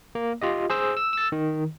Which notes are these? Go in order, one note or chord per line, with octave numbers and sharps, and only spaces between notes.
A#3
F4 G4 D#5
G#4 C5 E6
E6
E6 A6
D#3